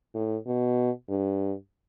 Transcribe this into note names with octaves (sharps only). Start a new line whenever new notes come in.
A2
B2
G2